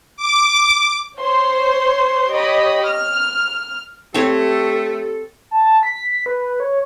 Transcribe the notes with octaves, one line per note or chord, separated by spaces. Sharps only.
D6
C5 C#5 C6
G4 C#5 D#5 B5
F6
A3 C4 G4 A4 C#5
A5
B6
B4
C#5